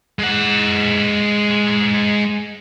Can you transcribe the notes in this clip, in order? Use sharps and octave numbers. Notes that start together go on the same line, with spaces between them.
G#3 F#5